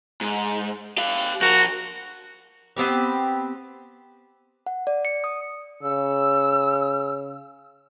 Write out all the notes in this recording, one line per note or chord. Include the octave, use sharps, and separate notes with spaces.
G#2
G4 F5
F3 F#4 A#4
B3 C4 G4 B4
F#5
D5
C#7
D#6
C#3 E6